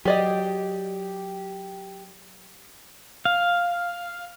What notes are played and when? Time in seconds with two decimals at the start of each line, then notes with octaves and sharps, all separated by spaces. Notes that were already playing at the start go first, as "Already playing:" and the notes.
0.05 F#3 G4 G#4 D5 D#5
3.25 F5